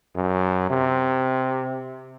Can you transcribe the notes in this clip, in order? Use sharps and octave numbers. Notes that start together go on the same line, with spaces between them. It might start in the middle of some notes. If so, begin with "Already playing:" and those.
F#2
C3